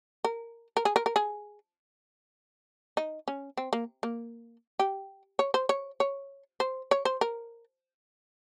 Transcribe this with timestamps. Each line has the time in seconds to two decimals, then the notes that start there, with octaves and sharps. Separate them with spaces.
0.24 A#4
0.77 A#4
0.85 G#4
0.96 A#4
1.06 A#4
1.16 G#4
2.97 D#4
3.28 C#4
3.57 C4
3.73 A#3
4.03 A#3
4.79 G4
5.39 C#5
5.54 C5
5.69 C#5
6.00 C#5
6.60 C5
6.91 C#5
7.05 C5
7.21 A#4